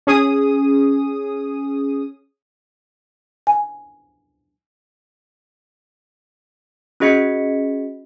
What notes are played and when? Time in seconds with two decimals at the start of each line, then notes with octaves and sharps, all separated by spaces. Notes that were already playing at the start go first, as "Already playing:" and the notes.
0.07 C#4 G#4 D#6
3.47 G#5
7.00 C#4 F#4 G#4 D#5 B6 C#7